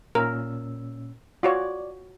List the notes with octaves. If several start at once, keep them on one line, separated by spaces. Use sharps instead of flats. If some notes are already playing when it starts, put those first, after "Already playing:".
A#2 C#4 A#4 E6
F4 F#4 C#5 D5